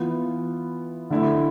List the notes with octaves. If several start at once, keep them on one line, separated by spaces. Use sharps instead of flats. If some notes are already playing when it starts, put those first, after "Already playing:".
Already playing: E3 B3 F4
D3 A3 E4